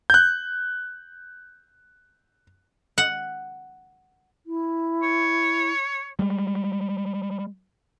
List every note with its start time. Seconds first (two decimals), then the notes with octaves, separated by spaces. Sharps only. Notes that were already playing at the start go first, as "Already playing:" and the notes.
0.10 F#6 G6
2.98 F#5
4.46 E4
5.03 C#5
6.19 G3 G#3